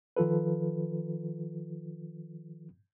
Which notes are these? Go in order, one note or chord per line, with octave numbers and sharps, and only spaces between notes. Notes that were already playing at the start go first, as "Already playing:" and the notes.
D#3 F3 F4 A4 B4